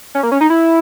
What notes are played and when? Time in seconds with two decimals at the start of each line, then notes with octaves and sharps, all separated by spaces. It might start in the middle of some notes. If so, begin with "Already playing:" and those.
0.15 C#4
0.23 A#3
0.32 C#4
0.41 D#4
0.50 E4